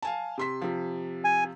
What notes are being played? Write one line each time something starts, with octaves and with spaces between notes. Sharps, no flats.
F5 G#5 A5
C3 C6 B6
C3 F3
G#5